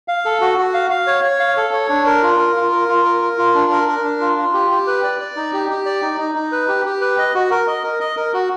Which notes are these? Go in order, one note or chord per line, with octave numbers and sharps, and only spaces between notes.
F5
A4
F#4
F#4
F5
F5
C#5
C#5
F5
A4
C#5
D4
A#4
F4
A#4
F4
A#4
F4
A#4
A#4
F4
D4
A#4
A#4
D4
F4
F4
G4
G4
B4
D5
D5
D#4
G4
G4
D5
D#4
D#4
D#4
B4
G4
G4
B4
D#5
F#4
A#4
D#5
A#4
D#5
A#4
F#4